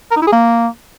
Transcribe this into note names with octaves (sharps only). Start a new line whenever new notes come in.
A#4
D#4
E4
G#4
A#3